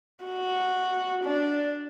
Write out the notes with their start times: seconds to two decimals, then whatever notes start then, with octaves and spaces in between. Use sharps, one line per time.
0.25 F#4
1.24 D4